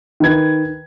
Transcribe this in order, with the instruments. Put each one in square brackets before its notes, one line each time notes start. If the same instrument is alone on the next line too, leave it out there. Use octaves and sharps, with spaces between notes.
[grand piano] D#3 B4 G#6